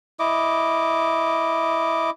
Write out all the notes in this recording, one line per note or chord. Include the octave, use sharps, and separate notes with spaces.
E4 D#5 D6